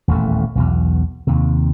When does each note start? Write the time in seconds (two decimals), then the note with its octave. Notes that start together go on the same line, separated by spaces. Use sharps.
0.08 D#1 A1 E2 A3
0.55 B1 E2 B2
1.27 D#2 C3